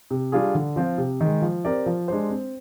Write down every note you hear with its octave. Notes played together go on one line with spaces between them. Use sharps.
C3
G3 D4 F4 G#4
D3
F3 C4 F4
C3
D#3 G#3
F3
C4 G4 A#4 D5
F3
G#3 D4 G4 C5
C4